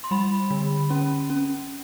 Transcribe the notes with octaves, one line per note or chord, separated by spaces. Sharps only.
C6
G3 B5
D3
C#4
C#4